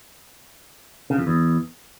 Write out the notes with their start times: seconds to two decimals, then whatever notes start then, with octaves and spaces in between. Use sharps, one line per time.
1.10 C#3
1.18 F2
1.27 E2